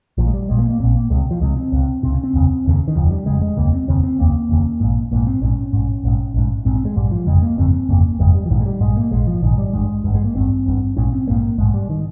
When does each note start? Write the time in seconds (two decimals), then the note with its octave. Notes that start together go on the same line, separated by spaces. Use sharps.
0.18 A#1 A#2 F3
0.27 G#3
0.34 G3
0.49 A#1 A#2 G#3
0.59 A#3
0.69 A#3
0.80 A#1 A#2 C4
0.95 A#3
1.10 C#2 C3 G#3
1.31 F3
1.41 C#2 C3 G#3
1.57 C4
1.72 C#2 C3
2.03 C#2 C3 C4
2.13 C#4
2.24 C4
2.34 F1 D#2 C#3
2.65 F1 D#2 C#3
2.88 D#3
2.95 F1 D#2 C#3 F3
3.11 G3
3.26 F1 D#2 C#3 G#3
3.42 G#3
3.57 F1 D#2 C#3 A#3
3.73 C4
3.88 F1 D#2 C#3 C4
4.03 C4
4.18 F1 D#2 C#3 A#3
4.49 F1 D#2 C#3
4.80 A#1 G#2
5.11 A#1 G#2 A#3
5.27 C4
5.41 A#1 G#2 C#4
5.73 A#1 G#2
6.03 A#1 G#2
6.34 A#1 G#2
6.65 A#1 G#2 C4
6.75 C4
6.85 G#3
6.96 A#1 G#2 G3
7.11 F3
7.27 G1 F2 C#3 G#3
7.42 A#3
7.58 G1 F2 C#3 C4
7.73 C4
7.89 G1 F2 C#3 A#3
8.19 G1 F2 C#3 G#3
8.34 G3
8.46 F3
8.50 A#1 G#2 D#3
8.61 G#3
8.66 G3
8.80 A#1 G#2 G#3
8.96 A#3
9.12 A#1 G#2 G#3
9.27 F3
9.42 A#1 G#2 D#3
9.58 G3
9.73 G#1 G2 G#3
10.04 G#1 G2
10.15 G#3
10.24 A#3
10.35 G#1 G2 C4
10.66 G#1 G2
10.97 A#1 G#2 C#4
11.12 C4
11.27 A#1 G#2 A#3
11.58 A#1 G#2 G#3
11.74 G3
11.90 D#3